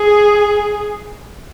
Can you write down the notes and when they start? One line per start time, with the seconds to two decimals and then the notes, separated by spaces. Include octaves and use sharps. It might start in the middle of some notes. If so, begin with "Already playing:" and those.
Already playing: G#4